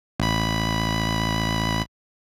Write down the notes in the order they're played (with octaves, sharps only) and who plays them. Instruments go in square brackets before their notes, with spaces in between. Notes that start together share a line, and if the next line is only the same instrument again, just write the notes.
[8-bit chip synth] A1 B5